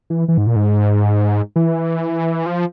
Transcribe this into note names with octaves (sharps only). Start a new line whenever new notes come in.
E3
E3
G#2
A#2
G#2
E3
F3